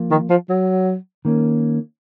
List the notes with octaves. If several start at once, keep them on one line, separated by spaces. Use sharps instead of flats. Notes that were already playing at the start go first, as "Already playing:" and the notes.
Already playing: F3 A#3 F4
D#3
F3
F#3
D#3 A#3 C#4